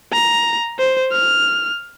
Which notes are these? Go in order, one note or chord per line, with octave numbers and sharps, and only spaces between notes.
A#5
C5
F6